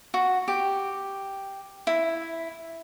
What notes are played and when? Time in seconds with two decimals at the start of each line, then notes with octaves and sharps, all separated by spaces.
0.14 F#4
0.48 G4
1.87 E4